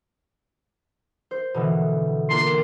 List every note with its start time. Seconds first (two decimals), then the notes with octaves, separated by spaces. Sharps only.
1.31 C5
1.54 B2 D3 E3
2.30 A#3 D4 F4 C6